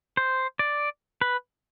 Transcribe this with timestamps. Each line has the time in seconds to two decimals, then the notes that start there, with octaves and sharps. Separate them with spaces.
0.17 C5
0.59 D5
1.21 B4